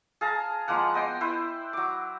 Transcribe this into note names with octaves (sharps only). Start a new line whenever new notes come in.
G#4 F5 A5 A#5
F3 G#3 A#3 F#5
B3 D#5 G5 C6
E4 B4 C5
F#3 D6